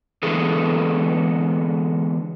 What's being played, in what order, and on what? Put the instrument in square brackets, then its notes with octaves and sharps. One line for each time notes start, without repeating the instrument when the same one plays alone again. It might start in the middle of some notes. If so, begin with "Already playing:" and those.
[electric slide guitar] D3 E3 G#3 B3 G#4 A4